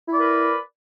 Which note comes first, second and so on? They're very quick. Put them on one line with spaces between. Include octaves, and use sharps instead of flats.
E4 D5 A#4 B4